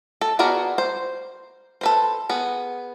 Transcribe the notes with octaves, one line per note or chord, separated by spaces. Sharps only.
A4
B3 F#4 G#4 A#4 D5
C5
A4 B4 C5
B3 G#4